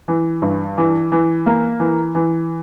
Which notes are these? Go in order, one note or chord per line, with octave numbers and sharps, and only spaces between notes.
E3
G2
E3
E3
A#3
E3
E3